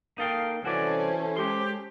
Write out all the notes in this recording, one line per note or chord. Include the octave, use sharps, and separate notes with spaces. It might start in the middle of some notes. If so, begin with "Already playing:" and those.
A#3 D#4 A4 F5 G5
C2 E3 C#4 F#4 A4 C5 D5 G#5
G#3 G4 C6